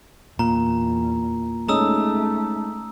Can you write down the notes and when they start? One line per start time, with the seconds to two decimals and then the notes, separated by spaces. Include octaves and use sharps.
0.39 E2 A#2 A#5
1.68 G#3 A3 C#4 D#4 A#5 D#6 E6